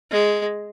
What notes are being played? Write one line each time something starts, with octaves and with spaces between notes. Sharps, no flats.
G#3